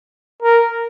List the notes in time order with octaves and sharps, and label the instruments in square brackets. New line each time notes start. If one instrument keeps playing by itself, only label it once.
[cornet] A#4